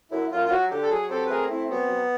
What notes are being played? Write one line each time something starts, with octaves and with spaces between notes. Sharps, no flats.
F#2 E4
F#2 F4
F4
F#3 F#4
D3 G4
A4
F#3 G#4
C4 G4 A4
B4
A3 G#4 A#4
C4 E4
F#3 B3
F#3